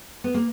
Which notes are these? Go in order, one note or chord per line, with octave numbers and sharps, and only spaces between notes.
B3
A#3